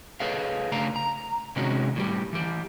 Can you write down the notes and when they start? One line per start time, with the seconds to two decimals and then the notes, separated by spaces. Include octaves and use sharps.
0.20 G#4 A4 B4 C#5 D#5 F5
0.72 C#3 A3 D4 F5 A#5
0.96 A#5
1.56 C3 D#3 G#3 C#4 D#4 F#4
1.96 A2 G3 G4
2.33 E3 G4